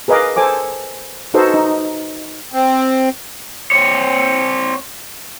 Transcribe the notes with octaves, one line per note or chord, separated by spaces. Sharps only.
G#4 A#4 B4 D#5 F5 D6
A4 C5 G#5 D6
D#4 F#4 A4 B4 C5 D#5
D#4
C4
C4 C#5